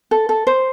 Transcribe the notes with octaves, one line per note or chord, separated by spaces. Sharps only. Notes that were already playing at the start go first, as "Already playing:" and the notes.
A4
A4
C5